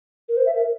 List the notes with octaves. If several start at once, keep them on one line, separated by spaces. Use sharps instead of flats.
A#4
C5
E5
A#4